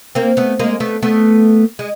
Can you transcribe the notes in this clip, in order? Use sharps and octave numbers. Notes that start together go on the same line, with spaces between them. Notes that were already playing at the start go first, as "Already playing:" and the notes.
A#3 C4
A3 B3
G#3 A#3
A3 B3
A3 B3
G#3